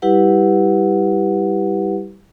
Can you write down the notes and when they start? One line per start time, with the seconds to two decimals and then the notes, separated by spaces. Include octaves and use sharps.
0.02 G3 E4 G4 B4 F#5